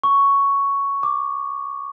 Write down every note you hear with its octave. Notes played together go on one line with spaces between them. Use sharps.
C#6
D6